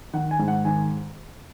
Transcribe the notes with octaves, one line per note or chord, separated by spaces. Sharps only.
D#3 F#5
G#5
G#2
F#5
D#3 G#5